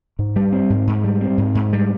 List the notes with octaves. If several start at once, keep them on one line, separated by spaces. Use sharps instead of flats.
G#2
G3
C4
G#2
G#2
G3
C4
G#2
G#2
G3